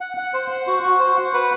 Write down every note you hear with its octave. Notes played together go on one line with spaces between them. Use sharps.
F#5
F#5
C5
F#5
F#4
F#4
C5
F#5
B4